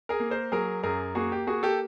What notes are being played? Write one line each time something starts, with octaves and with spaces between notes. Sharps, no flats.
G#4 A#4
A#3
A#4 C5
F#3 G#4 A#4
F#2 G#4 A#4
A#3 F#4 G#4
G4
A#3 F#4 G#4
G4 A4